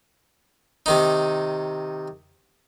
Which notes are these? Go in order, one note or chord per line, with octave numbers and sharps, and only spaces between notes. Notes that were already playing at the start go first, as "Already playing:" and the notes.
C3 D#3 D#4